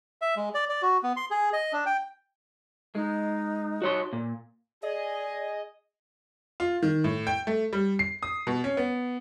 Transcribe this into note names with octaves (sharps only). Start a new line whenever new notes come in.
E5
G#3
D5
D5
F#4
B3
C6
G#4
D#5
D4
G5
G#3 D#4
F#4 C#5 C6
A#2
G#4 D5 D#5
F4
D#3
A2
G5
A3
G3
C7
D#6
B2
C#4
B3